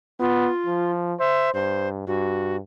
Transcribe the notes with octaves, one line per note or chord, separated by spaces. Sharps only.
B3 F4
F3
C5 E5
G2 C5
G2 F#4